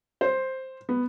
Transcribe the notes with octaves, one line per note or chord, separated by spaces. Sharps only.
C5
B3